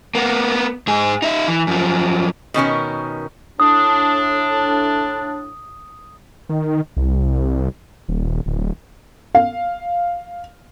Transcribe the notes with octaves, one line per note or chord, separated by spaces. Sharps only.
A#3 B3
G#2 G#4
D#4 E5
E3
F#2 F3
B2 D#3 C#4 A#4
A2 D4 D#6
D#3
C2
D#1
D1
F5